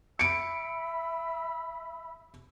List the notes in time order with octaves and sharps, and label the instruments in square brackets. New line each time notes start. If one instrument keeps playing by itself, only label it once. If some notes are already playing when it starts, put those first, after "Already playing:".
[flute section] E5 B5 E6 [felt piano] C#7 D7